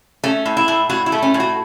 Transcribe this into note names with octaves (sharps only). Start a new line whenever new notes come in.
A3 C#4
A2
E4
A2
A2 F#4
E4
A3
C#4
A2
F#4